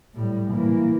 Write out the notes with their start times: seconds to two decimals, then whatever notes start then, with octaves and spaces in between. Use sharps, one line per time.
0.15 A2 G3
0.51 E3 A#3